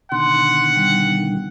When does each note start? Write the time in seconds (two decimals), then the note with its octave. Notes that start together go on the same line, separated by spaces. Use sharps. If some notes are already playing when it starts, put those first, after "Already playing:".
0.12 B2 D3 D#3 F#5 C6
0.76 G3